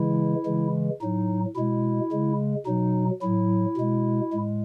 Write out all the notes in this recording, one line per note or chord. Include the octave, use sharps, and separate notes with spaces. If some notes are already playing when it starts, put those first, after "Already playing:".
Already playing: C#3 E3 G#3 E4
C#3 E3 G#3
A2 F#3 D#4
B2 G#3 E4
C#3 G#3
B2 F#3 D#4
A2 F#3 E4
B2 G#3
A2 G#3